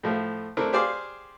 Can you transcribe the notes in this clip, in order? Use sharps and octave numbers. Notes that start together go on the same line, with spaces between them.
A2 F3 A3
A3 C4 D4 E4 A#4
G4 G#4 C5 D5 F5